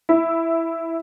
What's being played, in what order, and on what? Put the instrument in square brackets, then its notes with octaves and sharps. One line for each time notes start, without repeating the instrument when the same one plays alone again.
[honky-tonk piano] E4